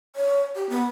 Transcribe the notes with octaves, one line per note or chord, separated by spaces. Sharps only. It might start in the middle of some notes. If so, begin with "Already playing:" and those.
C#5
G4
B3